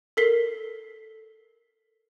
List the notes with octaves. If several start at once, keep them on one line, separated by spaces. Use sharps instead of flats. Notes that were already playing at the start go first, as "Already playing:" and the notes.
A4 A#4 B6 C7 G7